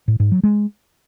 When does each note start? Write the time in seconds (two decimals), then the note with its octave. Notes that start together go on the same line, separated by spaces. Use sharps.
0.08 A2
0.20 G#2
0.32 F#3
0.43 G#3